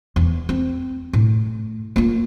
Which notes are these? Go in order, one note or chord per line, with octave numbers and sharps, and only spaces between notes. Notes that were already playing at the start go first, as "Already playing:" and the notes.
E2
C4
A2
A#3 F4